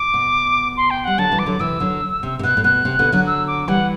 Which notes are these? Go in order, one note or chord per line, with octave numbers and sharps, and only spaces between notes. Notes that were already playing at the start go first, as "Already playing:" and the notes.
Already playing: D6
B2
C6
G5
G3 F#5
D3 F#3 A5
E3 G3
D6
D3 F#3
C3 E3 E6
D3 F#3
C3
C3
B2 F#6
A2
B2 F#6
C3
B2 D3
D3 F#3
E6
D6
E3 G3 F#5